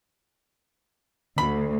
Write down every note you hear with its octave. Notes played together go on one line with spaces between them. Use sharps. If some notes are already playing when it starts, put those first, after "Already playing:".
D2 B5